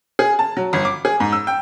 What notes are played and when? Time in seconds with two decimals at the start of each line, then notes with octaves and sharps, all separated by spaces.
0.19 G#4
0.39 A5
0.57 F#3
0.73 G1
0.85 D6
1.05 G#4
1.20 G#2
1.32 E6
1.47 G5